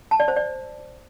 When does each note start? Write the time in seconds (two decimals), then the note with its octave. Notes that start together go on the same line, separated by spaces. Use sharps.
0.11 A5
0.20 D5
0.28 C5
0.36 D5